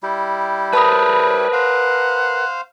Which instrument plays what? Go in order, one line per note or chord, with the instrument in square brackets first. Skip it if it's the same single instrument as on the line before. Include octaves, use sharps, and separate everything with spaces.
[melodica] G3 E4 G4
[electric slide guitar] A#4 B4 [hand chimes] A5 B5 D#6
[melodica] C5 F5 [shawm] F#5